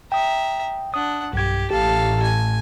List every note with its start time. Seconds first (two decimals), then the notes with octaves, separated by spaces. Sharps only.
0.12 E5 G5 A#5 D#6
0.94 D4 F#5 D#6
1.33 B1 G2 G4 G#6
1.71 A1 G4 A4 F5
2.23 G#5